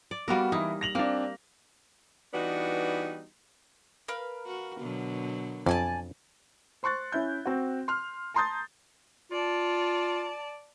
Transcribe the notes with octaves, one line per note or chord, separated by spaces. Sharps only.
D5
G3 A#3 B3 F#4 A#4
E3 D#4 E4
A#6 F7 F#7
A#3 C4 D4
E3 G3 B3 D4 D#4 F#4
A#4 B4 F5
F#4
B2 D3 F#3
F2 D5 G#5 A5
C5 C6 C#6 F#6 A6
C#4 E4 G6
C4 F#4
C6 F6
A5 A#5 C6 D#6 G6 A6
F4 D5 A5